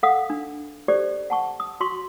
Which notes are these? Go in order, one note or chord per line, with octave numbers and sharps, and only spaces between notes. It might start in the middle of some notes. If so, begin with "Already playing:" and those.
A4 F5 F#5 D#6
D4
G4 A4 C5 D5
F#5 A5 C#6
D#6
F#4 C6 C#6